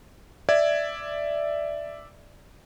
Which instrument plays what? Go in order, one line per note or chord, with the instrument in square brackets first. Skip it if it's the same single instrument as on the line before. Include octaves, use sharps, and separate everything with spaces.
[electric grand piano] D5 E5 G#6